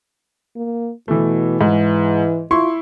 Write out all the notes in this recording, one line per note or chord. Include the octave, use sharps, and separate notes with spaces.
A#3
B2 E3 A3
G#2 E3
E4 F4 C6 C#6